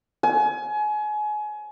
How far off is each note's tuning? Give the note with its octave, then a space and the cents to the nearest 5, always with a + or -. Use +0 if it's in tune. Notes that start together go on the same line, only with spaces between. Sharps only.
G#5 +30